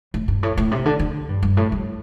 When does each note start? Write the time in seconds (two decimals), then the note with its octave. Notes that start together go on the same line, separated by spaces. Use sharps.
0.14 A2
0.28 G2
0.43 A2
0.57 A2
0.71 C3
0.85 D3
0.99 D3
1.29 G2
1.43 G2
1.57 A2
1.72 G2